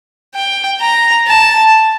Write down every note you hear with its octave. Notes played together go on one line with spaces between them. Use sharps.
G5
A#5
A5